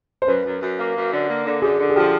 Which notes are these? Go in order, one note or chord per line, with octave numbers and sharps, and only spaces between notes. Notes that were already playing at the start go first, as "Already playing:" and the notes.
C5
F#2 B4
F#2
F#2
A#3
F#2
D3
A#3
D3
F#2 G#4
D3
G#4
F3 G4